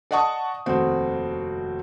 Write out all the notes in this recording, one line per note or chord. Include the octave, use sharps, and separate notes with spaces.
D5 D#5 F#5 A5 C#6 D#6
F1 D#2 C4 F#4